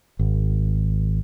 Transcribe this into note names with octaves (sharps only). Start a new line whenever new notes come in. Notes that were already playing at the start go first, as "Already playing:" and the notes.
G#1